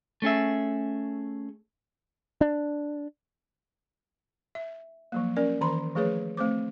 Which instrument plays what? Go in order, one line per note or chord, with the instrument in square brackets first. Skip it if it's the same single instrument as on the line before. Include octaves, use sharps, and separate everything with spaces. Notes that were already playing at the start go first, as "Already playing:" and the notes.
[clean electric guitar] A3 C#4 G#4 E5
[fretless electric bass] D4
[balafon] E5
F3 F#3 A#3
C#4 A#4 D5
D#3 E3 A#5 C6
F3 A3 G#4 B4 C#5
A3 C4 C5 D6